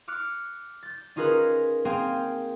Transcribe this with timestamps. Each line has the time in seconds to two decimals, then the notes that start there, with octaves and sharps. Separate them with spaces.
0.08 D6 F6 F#6 C#7 D7
0.83 G6 A6
1.16 C#4 D#4 F4 G#4 A#4 B4
1.85 A#3 C4 G#4 F5 G5 G#5